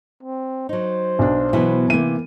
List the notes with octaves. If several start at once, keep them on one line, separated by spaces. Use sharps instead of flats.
C4
F#3 D#4 C5
B1 D4
B2 E3 F#3 B4
C3 E3 A#3 D#7